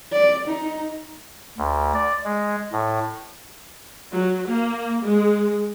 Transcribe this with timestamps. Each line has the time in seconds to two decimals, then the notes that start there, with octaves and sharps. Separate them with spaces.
0.12 D5
0.48 D#4
1.58 D2
1.95 D5
2.25 G#3
2.73 A2
4.11 F#3
4.48 A#3
5.05 G#3